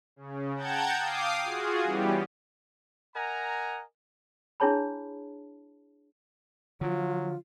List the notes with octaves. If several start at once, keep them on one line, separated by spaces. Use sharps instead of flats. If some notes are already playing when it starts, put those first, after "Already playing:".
C#3
F#5 G5 A5 A#5 G6 G#6
F5 G5 D6 D#6 C7
F4 F#4 G#4
E3 G3 B3 C#4 G4
A#4 D#5 F#5 G#5 A#5
D4 E4 G#4 C#5 A5 B5
D3 F3 F#3 F4